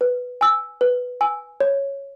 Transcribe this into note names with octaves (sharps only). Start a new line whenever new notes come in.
B4
G#5 E6
B4
G#5 E6
C#5